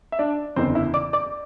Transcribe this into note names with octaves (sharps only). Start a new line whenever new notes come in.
E5
D4 D5
F#1 E2 D3 C4 C5
E4 E5
D5 D6
D5 D6